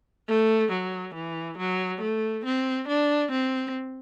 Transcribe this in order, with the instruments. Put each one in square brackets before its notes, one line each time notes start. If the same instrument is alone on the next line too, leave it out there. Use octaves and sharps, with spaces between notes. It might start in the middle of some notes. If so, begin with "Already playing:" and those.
[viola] A3
F#3
E3
F#3
A3
C4
D4
C4